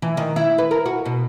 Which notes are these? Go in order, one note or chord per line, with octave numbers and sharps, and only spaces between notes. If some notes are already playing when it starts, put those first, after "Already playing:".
E3
D#3
E4
B4
A#4
F#4
B2